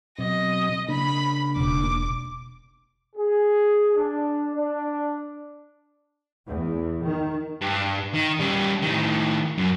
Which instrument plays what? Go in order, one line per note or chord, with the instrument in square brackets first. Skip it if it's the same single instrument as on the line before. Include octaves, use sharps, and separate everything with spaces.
[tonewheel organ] B2 F#3 C4 [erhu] D#5
[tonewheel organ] C#3 A#3 D4 [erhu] B5
[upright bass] E1 [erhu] D6
[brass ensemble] G#4
D4
D4
[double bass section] E2
D#3
[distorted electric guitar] G2
D#3
G3 C#4
A2 D#3
F#2